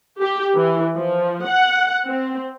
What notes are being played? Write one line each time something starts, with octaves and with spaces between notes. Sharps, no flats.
G4
E3
F3
F#5
C4